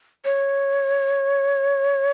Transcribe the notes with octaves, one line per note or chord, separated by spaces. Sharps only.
C#5